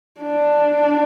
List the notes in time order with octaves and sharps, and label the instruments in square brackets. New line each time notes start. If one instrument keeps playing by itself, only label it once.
[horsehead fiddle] D4